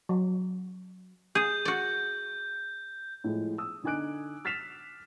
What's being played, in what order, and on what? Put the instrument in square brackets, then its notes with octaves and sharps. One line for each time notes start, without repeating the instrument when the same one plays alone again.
[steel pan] F#3
[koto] G#4 [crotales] G6
[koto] F#4 D5
[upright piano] A2 F3 G#3
D#6 E6
D3 D#4 G#5 D6 F#6 D7
F6 A6 B6 C7 E7 F7